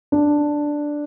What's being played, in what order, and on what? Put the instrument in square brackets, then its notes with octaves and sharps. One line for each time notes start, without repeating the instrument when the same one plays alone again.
[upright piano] D4